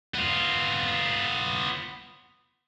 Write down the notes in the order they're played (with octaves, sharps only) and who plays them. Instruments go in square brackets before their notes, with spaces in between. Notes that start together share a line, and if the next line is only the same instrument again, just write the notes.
[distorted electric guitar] B3 F4